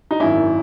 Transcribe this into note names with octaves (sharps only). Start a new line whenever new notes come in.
D#4
G#1 F#2 D#3 E4